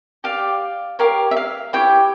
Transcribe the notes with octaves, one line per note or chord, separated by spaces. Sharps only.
G4 D5 F5
G4 A#4 C#5 F5
E5
F5
E4 G4 C#5 G5